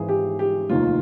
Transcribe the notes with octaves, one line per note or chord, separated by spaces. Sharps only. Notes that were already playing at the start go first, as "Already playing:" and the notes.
Already playing: G#1 G#2 E3 G#4
G4
G4
F1 D#2 D#3 F4